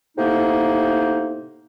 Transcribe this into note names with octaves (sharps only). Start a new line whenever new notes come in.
A2 C3 A#3 B3 D#4